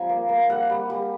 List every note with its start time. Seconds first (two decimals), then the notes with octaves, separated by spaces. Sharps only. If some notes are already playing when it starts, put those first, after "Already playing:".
Already playing: F3 G3 C4 G#5 A#5
0.09 A#3
0.29 A#3
0.49 G3 F#5
0.69 G3
0.90 G3